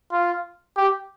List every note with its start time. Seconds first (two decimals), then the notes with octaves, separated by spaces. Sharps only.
0.12 F4
0.77 G4